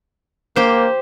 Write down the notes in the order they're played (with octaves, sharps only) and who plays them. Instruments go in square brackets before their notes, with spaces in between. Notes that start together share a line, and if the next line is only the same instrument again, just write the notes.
[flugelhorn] A#3 [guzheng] G4 C5